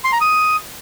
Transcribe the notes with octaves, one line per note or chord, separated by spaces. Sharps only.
C6
A#5
D#6